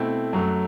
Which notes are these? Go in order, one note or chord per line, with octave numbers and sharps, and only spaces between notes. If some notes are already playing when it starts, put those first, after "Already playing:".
Already playing: B2 A3 C4 E4
F#2 F#3 A3